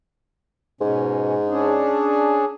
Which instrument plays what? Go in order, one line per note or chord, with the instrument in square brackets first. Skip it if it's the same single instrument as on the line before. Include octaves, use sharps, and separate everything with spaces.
[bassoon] G#2 [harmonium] B2 C#4
[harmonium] C#4 D4 G#4